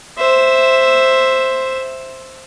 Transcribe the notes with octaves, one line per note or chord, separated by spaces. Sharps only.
C5 E5